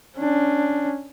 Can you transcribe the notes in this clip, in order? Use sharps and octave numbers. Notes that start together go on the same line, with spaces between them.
C#4 D4